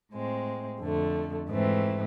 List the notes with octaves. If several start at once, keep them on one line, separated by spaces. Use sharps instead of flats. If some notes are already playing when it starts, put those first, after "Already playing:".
A2 G#3 C4
F2 D3 A3
G#2 E3 A3 C4